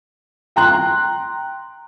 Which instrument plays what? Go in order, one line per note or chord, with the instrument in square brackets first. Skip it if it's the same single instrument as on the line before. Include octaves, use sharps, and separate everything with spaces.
[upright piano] G5 A#5 C6 F#6